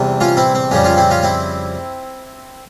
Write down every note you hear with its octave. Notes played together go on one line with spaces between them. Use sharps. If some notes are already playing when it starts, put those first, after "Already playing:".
Already playing: E2 C3 G3
C#4 F4
C4 E4
C4
F2 C#3 G3 C#4
C#4 F4
C4 E4
C#4 F4
C4 E4